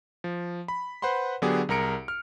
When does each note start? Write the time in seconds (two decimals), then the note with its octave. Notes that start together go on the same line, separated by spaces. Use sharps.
0.24 F3
0.68 B5
1.02 B4 C5 F#5 B5 C6
1.42 D3 F#3 B3 D4 G4 G#4
1.69 C2 G#4 A#4 A#5 C#7 D7
2.08 F6